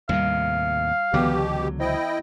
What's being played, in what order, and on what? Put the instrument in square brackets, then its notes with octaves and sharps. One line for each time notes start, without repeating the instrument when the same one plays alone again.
[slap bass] D#2 A2 C3 [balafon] G3 [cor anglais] F5
[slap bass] C#2 D3 F#3 [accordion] B2 G4 [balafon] E3 B3 D6
[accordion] E4 D#5 G5 [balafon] C5